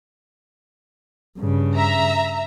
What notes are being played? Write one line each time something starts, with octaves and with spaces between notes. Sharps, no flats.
G2 C#3
E5 A#5